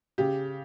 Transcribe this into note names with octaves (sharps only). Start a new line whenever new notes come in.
C#3 G4